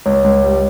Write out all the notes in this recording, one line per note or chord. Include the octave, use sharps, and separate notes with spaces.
C#2 C#5
C#2
G3